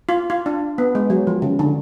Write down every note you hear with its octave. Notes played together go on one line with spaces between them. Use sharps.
F4
F4
D4
B3
G#3
F#3
F3
C#3
D3